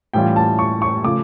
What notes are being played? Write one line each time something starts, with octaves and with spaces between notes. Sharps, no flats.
A2 E3 G3 C#4 F4 G5
A5
C#6
C#6
C#3 F3 A3 D6